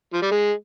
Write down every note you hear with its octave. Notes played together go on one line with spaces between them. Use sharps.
F3
G3
G#3